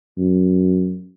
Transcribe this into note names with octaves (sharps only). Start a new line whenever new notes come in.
F#2